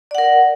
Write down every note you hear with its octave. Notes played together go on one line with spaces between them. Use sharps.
A#4 D5 F#5